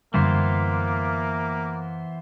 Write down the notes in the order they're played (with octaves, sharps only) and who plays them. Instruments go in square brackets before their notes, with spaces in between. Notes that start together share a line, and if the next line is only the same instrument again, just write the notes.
[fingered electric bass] F#2 D3 G3 [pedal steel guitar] E3 B3 C5 [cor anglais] A#3